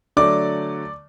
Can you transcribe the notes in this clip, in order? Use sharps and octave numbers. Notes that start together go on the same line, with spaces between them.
D3 F#3 A3 D5 D6